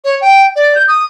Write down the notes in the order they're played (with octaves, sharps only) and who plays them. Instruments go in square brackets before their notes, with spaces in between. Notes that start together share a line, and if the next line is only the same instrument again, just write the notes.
[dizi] C#5
G5
D5
G6
D#6